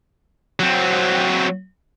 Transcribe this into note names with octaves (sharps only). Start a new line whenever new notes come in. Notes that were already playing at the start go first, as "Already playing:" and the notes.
F#3 C4